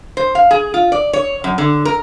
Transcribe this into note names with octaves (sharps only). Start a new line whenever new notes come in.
C5
F5
G#4
F4
D5
C#5
F#2
D3
A#4